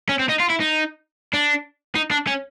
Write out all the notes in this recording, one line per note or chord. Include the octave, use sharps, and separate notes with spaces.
C#4
C4
D#4
F4
E4
D#4
D4
D#4
D4
C#4